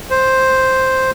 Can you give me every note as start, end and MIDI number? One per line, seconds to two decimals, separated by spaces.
0.10 1.11 72